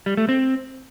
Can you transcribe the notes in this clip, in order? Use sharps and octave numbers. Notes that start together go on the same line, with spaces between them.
G3
A3
C4